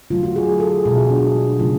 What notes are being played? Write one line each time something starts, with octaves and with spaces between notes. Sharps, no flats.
D3 F#3 A3 F4
F#4
G#4
A4
B2 G#3 G#4
F#4
D4
C#3 F#3 A3 F4